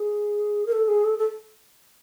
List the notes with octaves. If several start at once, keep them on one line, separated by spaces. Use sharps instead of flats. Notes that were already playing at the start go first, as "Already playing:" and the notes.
Already playing: G#4
A#4
A4
G#4
A4
A4